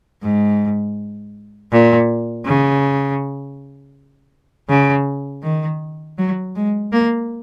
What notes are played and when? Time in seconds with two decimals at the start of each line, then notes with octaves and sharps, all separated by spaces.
0.23 G#2
1.72 A#2
2.45 C#3
4.69 C#3
5.43 D#3
6.18 F#3
6.55 G#3
6.92 A#3